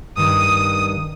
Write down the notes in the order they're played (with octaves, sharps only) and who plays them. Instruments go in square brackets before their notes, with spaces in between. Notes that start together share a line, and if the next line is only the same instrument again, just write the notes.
[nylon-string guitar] G2 D#3 [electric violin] D#6